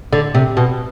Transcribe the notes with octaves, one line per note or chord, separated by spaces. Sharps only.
D3
C3
B2